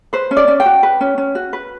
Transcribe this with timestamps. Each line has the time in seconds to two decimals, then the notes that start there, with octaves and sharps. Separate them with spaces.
0.13 B4 C5
0.31 C#4
0.37 D5
0.48 C#4
0.60 G5
0.66 F#4
0.83 B4
1.01 C#4
1.18 C#4
1.35 F#4
1.53 B4